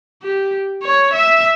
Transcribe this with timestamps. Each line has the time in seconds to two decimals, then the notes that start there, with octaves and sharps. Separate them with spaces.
0.23 G4
0.83 C#5
1.13 E5